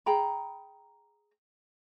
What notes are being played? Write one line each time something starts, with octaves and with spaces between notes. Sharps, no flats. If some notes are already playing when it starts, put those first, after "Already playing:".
G#4 G5 A#5 B5